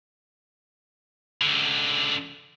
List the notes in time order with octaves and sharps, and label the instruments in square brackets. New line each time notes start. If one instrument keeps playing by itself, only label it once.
[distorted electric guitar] C#2 D3